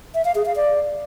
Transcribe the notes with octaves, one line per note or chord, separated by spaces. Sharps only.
E5
F5
G#4
F5
D5